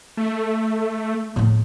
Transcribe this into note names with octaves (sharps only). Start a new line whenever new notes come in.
A3
A2 G#3